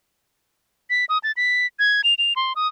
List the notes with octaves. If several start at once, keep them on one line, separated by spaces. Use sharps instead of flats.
B6
D#6
A6
B6
G#6
F7
F7
C6
D#6